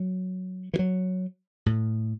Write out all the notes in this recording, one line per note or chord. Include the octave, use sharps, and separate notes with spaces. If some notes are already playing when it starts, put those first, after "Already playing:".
Already playing: F#3
E3
F#3
A2